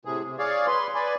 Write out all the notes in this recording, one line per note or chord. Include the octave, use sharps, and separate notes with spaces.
A2 C3 G#4
C3
G#4 C#5 D5 F5
B4 C6
B4 D5 G#5